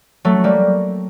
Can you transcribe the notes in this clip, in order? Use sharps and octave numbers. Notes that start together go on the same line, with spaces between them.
F#3 A3
G3 A#3